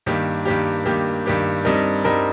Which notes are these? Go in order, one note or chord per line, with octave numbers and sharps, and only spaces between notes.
G2 D#3 A#3 G4
G2 D#3 A#3 G4
G2 D#3 A#3 G4
G2 D#3 A#3 G4
G2 G3 C4 D#4 A#4
G2 G3 C4 D#4 A#4